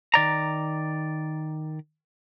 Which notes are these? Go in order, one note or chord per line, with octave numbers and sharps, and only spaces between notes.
D#3 D5 A#5